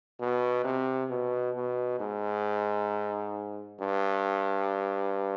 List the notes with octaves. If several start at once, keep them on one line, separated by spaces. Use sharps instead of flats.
B2
C3
B2
B2
G#2
G2